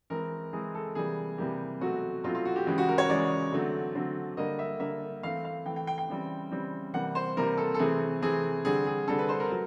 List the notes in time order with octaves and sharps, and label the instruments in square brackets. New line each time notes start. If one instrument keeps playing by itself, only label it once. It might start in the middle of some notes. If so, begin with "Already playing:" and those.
[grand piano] E3 G#3 C4 A#4
E3 G#3 C4 G#4
A4
C3 E3 G3 A#3 G#4
C3 E3 G3 A#3 G4
B2 F#3 A3 C4 F#4
B2 F#3 A3 C4 F4
F4
F#4
G4
C#3 E3 G#3 G4
F#4
A#4
C#5
C#3 E3 G#3 D5
D3 F#3 A3 C4
D3 F#3 A3 C4
D3 G3 A#3 D#5
E5
D3 G3 A#3 E5
E3 A3 C4 F5
F5
E3 A3 C4 G5
G5
G5
G5
C#3 E3 G3 C4
C#3 E3 G3 C4
C3 E3 G3 A#3 F#5
C5
C3 E3 G3 A#3 A#4
A4
A4
C3 E3 A3 C4 G#4
C3 E3 A3 C4 G#4
D3 G3 C4 G#4
G#4
D3 G3 C4 A4
B4
C5
A#4
F#3 A3